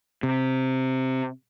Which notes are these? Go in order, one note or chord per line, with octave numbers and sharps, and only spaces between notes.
C3